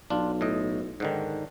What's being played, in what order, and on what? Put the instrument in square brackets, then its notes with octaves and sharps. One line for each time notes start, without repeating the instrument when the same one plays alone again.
[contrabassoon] B1 [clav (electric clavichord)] D4 F4
[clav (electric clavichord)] A2 D#5
G#2 D3 D#3